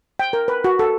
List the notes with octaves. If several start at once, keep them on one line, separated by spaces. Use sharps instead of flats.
G5
A#4
B4
F#4
A4